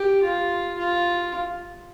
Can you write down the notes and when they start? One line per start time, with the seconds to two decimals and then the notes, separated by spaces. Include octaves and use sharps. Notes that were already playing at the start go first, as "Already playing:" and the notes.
Already playing: G4
0.24 F4
0.78 F4